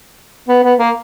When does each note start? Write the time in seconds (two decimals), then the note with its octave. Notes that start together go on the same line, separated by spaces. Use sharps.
0.48 B3
0.63 B3
0.79 A#3